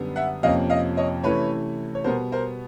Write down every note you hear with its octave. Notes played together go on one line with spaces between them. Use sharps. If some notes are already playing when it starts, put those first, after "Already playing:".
Already playing: F#2 D3 G3 B3
E5 F#5
F2 C3 F3 A#3 C#4 D#5 F5
D#5 F5
C#5 D#5
C3 E3 A3 C#4 E4 B4 C#5
C#5
B2 G3 B3 A#4 C5
A#4 C5